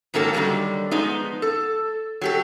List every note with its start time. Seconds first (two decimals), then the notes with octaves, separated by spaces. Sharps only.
0.14 G#2 D#3 F#3 A#3 A4 A5
0.33 D3 D#3 F#3 G3 A#3
0.91 F3 G#3 B3 D#4
1.42 A4
2.21 F#3 G4 A4